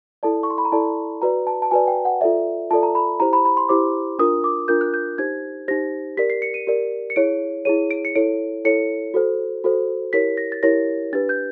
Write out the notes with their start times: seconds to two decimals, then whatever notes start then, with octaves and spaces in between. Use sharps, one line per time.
0.23 E4 A4 D5 A5
0.43 C#6
0.50 C6
0.58 B5
0.65 A#5
0.72 E4 A4 D5 A5
1.22 F#4 B4 D5 A#5
1.47 A5
1.62 A5
1.71 F#4 B4 D5 G#5
1.87 G5
2.05 F#5
2.21 F4 A4 D5 E5
2.71 F4 A4 D5 A5
2.83 A#5
2.95 B5
3.20 E4 G4 C5 A#5
3.33 B5
3.45 B5
3.57 C6
3.69 E4 G4 C5 D6
4.19 D4 F4 A#4 D#6
4.44 D6
4.68 D4 F4 A#4 G6
4.81 F#6
4.94 G6
5.18 D#4 G4 C5 G#6
5.68 D#4 G4 C5 A#6
6.17 G4 A#4 D5 B6
6.30 C7
6.42 C#7
6.54 D#7
6.67 G4 A#4 D5
7.10 C#7
7.16 E4 G#4 C#5 D7
7.65 E4 G#4 C#5 D#7
7.91 D7
8.05 C#7
8.15 E4 A4 C#5 D7
8.65 E4 A4 C#5 C#7
9.14 F#4 A4 C5
9.64 F#4 A4 C5
10.13 E4 G4 A#4 C#5 B6
10.37 A#6
10.52 A6
10.63 E4 G4 A#4 C#5 A#6
11.13 D4 G4 B4 A6
11.29 G6